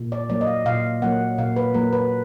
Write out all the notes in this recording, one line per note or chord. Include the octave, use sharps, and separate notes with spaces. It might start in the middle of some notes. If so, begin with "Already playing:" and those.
Already playing: A#2
D5
F#3 A#3 D5
D#5
F5
A#2 F5
F#3 A#3 F#5
A#2 F5
B4
F#3 A#3 A#4
B4